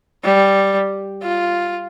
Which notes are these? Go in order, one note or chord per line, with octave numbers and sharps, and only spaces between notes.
G3
F4